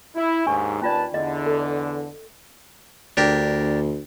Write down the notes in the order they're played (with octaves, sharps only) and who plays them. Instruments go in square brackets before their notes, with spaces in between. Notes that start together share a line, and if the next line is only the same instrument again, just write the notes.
[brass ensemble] E4
[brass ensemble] D#2 G#2 [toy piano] D4 G#5 C#6
[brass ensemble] D#2 B4 A5 [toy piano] C#4 F4 D5
[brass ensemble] E2 D3 [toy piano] D#5
[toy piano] A4
[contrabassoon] D2 [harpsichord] D4 G4 A#4